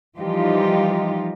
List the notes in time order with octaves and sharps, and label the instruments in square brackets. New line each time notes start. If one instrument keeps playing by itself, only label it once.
[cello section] E3 F3 G3 D#4 F4 G4